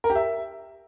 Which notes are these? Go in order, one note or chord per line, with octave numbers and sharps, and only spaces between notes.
A#4
G4
E5